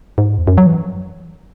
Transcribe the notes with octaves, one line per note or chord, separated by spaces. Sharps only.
G#2
E2
F#2
F#3
E3